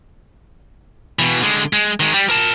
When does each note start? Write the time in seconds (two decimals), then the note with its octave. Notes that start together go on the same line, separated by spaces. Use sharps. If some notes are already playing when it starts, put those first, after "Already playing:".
1.19 B2 E3
1.42 D3 G#3
1.73 G#3
2.00 D#3 G#3
2.14 G3
2.30 A#4 A5